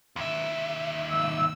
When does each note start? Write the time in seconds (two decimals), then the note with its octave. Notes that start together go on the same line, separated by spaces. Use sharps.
0.16 D#2 E5
1.11 E6